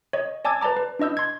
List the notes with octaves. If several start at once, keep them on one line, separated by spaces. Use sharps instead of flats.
C#5 D#5
D5 G#5 A5 D6 E6 G#6
B4 D5 A5 A#5 D6
B4
D4 E4 D#5 E6 G6
C6 G#6